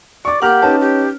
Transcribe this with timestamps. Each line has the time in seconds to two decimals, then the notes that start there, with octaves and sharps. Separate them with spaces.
0.25 D5 C#6 D6
0.42 A#3 G4 F#5 A#5 D6 F6
0.62 C#4 D#4 B4 C#5 A5
0.81 G4